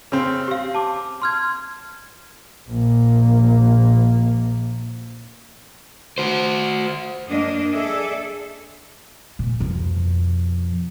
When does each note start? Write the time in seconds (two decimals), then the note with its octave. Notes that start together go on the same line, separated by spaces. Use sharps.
0.12 C#3 C4
0.48 G4 F5
0.74 A5 D6
1.22 C6 F6 G#6
2.69 A#1 A#3
6.18 F#4 C5
7.28 F#2 A#3 D4 D#5
7.72 G#4 A4 D5 E5
9.39 A#2
9.60 F2 B2